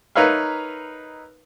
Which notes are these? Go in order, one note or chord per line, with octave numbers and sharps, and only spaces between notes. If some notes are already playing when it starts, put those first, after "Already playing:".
D#4 A#4 B4 C#5 E5 F5